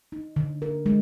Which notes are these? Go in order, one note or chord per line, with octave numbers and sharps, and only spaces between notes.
D#4
D3
A#4
G#3